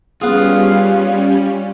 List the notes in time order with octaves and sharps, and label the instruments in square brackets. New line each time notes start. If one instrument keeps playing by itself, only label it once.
[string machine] G3 C#4 [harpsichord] B3 G#4 [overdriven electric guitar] F4